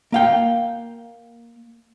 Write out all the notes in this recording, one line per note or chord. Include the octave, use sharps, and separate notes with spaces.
A#3 F5 G5